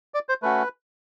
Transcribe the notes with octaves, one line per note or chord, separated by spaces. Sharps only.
D5
C5
A3 C#4 F#4 B4